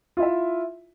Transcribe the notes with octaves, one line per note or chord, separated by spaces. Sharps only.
E4 F4 E5